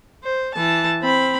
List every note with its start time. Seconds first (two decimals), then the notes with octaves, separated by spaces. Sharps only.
0.24 C5
0.55 E3 A5
1.03 C4 B5